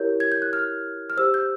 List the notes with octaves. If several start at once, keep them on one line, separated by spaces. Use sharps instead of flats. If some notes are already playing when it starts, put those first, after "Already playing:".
Already playing: E4 G4 A#4 C#5 G6
G#6
G6
F#6
F6
F6
G4 C5 E6
G6